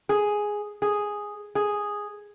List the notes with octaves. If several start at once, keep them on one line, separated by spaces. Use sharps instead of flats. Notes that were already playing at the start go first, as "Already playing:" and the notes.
G#4
G#4
G#4